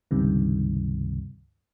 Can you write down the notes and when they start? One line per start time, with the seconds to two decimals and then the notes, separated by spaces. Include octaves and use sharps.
0.11 C#2 G2 C3 D#3